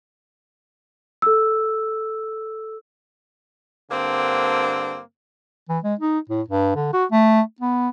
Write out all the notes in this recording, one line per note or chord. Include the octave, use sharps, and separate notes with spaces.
A4 E6
G2 D3 A#3 C4
E3
G#3
D#4
A2
G2
D3
F#4
A3
B3